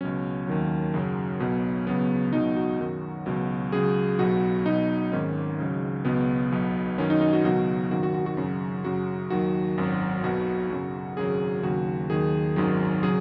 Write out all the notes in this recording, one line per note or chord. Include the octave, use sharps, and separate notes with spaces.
C#2 B2 F#3 C#4
D#2 D#3 F#3
F#2 C#3 F#3
B1 B2 F#3
C#2 C#3 F#3 B3
C#2 B2 F#3 D#4
F#4
F#2 D#3 F#3
C#2 B2 F#3
C#2 C#3 F#3 G#4
B1 B2 F#3 F#4
B1 B2 F#3 D#4
G#1 G#2 D#3 C#4
C#2 C#3 F#3
C#2 B2 F#3 B3
B1 B2 F#3
F#2 D#3 F#3 C#4
D#4
D#4
F#4
C#2 B2 F#3 F#4
G#1 F#2 D#3 F#4
F#4
F#4
F#4
F#2 C#3 F#3
F#2 C#3 F#3 F#4
D#2 D#3 F#3 F#4
G#1 F#2 F#3
B1 B2 F#3 F#4
F#2 C#3 F#3
G#1 F#2 C#3 F#3 G#4
D#2 C#3 F#3 F#4
D#2 D#3 F#3 G#4
G#1 F#2 D#3 F#3
C#3 F#3 G#4